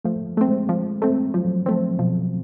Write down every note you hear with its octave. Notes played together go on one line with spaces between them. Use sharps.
F3 A3
A3 C4
G#3
F3
A3 C4
F3 F#3
F3 A3 C4
B2 F3